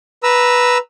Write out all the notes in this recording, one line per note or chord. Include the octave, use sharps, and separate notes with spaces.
B4 A#5 E6